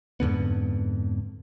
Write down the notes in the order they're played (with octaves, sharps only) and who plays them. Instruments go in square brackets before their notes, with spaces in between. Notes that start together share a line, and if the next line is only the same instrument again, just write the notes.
[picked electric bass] F2 G#2 D3 B3